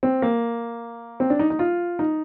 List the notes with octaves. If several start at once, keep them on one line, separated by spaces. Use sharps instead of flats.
C4
A#3
C4
D4
D#4
D#4
F4
D#4